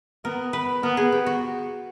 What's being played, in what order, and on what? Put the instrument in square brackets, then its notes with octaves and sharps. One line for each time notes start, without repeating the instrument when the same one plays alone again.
[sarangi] B3 [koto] A#4
[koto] B4
[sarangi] B3 [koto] A#4
[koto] G#4
G4
F#4